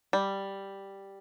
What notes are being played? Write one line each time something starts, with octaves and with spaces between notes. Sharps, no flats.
G3